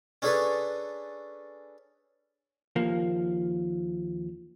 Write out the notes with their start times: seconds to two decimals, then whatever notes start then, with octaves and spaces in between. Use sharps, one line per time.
0.22 C#4 D4 G#4 A4 B4 C#5
2.76 D#2 F3 A#3